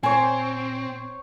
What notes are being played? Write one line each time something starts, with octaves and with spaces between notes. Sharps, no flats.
A#2 C4 C5 C#5 G#5